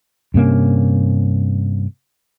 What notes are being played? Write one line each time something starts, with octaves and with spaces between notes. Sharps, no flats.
G2 C3 A#3 C#4